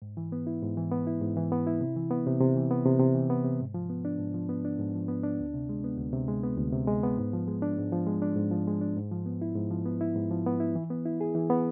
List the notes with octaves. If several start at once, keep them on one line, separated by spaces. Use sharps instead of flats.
G#2
E3
B3
E4
G#2
E3
B3
E4
G#2
E3
B3
E4
C3
E3
B3
C3
C3
E3
B3
C3
C3
E3
B3
C3
G#2
F3
B3
D4
G#2
F3
B3
D4
G#2
F3
B3
D4
D2
C3
G#3
B3
D2
C3
G#3
B3
D2
C3
G#3
B3
G#2
F3
G#3
D4
G#2
F3
G#3
D4
G#2
F3
G#3
D4
G#2
F3
B3
E4
G#2
F3
B3
E4
G#2
F3
B3
E4
E3
B3
E4
G#4
E3
B3